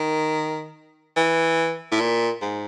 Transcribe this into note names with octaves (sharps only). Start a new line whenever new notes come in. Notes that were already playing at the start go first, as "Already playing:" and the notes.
Already playing: D#3
E3
A2
A#2
G#2